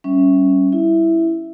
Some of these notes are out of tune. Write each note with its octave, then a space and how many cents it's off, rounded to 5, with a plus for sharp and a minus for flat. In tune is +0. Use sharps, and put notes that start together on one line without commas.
G3 -15 C#4 +0 E5 +0
E4 +0 E5 +0